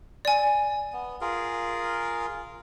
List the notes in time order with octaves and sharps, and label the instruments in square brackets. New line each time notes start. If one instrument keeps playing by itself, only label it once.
[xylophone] D5 G#5
[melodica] B3
F4 G#4 A#4